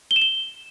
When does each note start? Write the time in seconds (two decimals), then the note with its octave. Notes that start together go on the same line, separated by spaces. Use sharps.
0.11 G7
0.16 E7
0.22 G7